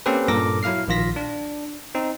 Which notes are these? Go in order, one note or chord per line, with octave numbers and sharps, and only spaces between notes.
A#3 C4 C#4 G4 A4 B4
G2 A#2 A4 A#4 D6 A#6
F#3 E4 F5 F6 C7
A#1 D#3 F4 A#6 B6
D4
C4 D#4